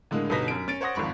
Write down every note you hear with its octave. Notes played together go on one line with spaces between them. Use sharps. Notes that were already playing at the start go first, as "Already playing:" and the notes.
A2 D3 G#3 A#3
G1 B2 D#4 B4 A#6 B6
F#2 D7
C#4 A6 D7
C5 C#5 F#5 C6 D#6 A#6
G#1 F2 G#2 B5 C#6